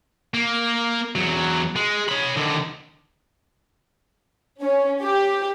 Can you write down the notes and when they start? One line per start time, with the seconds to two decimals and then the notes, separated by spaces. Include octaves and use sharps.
0.34 A#3
1.16 E2 F#3
1.76 G#3
2.09 C#5 B5
2.37 D#2 D3
4.61 C#4
5.02 G4